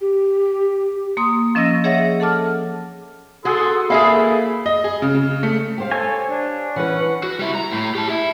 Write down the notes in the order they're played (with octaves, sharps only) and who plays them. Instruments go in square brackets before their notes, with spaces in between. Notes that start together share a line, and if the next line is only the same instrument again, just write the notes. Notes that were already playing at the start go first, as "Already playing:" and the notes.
[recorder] G4
[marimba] A#3 C6 D#6
F3 C#4 D#5 E6 A#6
G#4 C#5 D#5 E5 F#5 A#6
A4 F#5 A5 D6 F6
[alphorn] F#4 [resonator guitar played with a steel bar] G#4 F#5 [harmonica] A4 C6
[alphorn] A#3 [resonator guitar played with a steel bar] G#4 E5 F5 [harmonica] A4 G#5 B5
[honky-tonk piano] D#5
G#4
C#3
C#3
A3
[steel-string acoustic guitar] G4 C5 F5
[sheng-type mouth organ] A4 [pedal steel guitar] C#5 G#5
[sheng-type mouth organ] D4
[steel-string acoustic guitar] E3 B4 [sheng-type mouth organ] C#4 F#5
[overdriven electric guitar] F#4
G3 E4
A#5
A2
G4 A5
E4